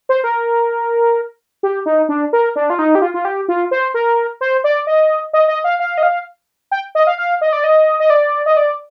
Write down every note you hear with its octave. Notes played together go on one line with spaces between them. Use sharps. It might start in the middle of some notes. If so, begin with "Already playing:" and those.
C5
A#4
G4
D#4
D4
A#4
D4
F4
D#4
G4
F4
F4
G4
F4
C5
A#4
C5
D5
D#5
D#5
D#5
F5
F5
D#5
F5
G5
D#5
F5
F5
D#5
D5
D#5
D#5
D5
D#5
D5